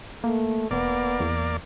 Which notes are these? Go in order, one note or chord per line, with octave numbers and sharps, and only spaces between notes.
A3 A#3
E1 A#3 B3 D5
E2